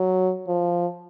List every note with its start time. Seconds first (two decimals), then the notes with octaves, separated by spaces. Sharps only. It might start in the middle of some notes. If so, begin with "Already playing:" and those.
Already playing: F#3
0.48 F3